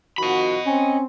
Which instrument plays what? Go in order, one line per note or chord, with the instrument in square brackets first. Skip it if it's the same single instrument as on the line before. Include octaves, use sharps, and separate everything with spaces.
[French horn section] D#3 F3 F#4 [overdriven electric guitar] D#5 B5
[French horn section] C4 [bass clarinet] C#4